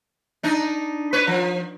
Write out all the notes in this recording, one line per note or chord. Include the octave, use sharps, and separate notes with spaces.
D4 D#4
B4 C#5
F3